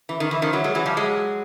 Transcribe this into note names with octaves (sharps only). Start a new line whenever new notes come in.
E3
D#3
E3
D#3 F3
E3 F#3
F#3 G#3
E3 F#3
F3 G3
F#3 G#3